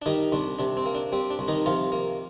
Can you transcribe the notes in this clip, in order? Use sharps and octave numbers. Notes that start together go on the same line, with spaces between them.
D4
D#3 G3 D#4
C2 D4
C3 D4
C4
A#3
D4
G3 C4
D4
C2
D#3 D#4
C3 F3 F4
A#3